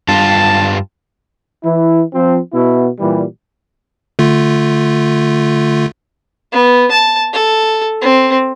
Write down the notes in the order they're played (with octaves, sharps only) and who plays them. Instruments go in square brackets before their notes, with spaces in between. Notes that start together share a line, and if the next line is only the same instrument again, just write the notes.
[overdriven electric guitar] G2 F4 [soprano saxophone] A5
[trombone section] E3 E4
F3 C4
B2 B3 E4
A#2 E3 G3
[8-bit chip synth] D3 A3 F4
[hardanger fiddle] B3
A5
A4
C4